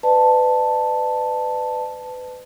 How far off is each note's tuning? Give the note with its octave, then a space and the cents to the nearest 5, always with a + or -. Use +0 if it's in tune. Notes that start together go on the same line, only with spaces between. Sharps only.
B4 +30 D5 +40 A5 +0